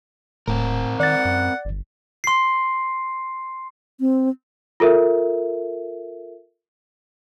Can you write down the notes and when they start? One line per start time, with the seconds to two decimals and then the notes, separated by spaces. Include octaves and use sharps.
0.48 D#1 A2 C4 A#4
1.00 D#3 D5 F#5 A6
1.25 F#2
1.65 G1
2.24 C6 C7
4.00 C4
4.80 F4 A4 A#4 E5